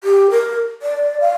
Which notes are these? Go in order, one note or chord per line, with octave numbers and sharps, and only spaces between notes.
G4
A#4
D5
F5